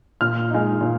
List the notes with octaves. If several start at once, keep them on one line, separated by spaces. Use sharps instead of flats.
A#2 F6
G#3 D#4
A#2